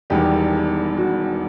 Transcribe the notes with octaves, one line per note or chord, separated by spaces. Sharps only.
E1 E2 D#3 G3 G4
F#4